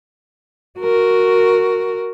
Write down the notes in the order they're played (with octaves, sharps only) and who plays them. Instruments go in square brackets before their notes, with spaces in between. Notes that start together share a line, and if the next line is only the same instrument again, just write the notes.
[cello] F#4 A#4